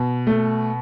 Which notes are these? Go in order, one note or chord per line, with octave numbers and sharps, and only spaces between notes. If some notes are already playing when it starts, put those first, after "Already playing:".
Already playing: B2
A3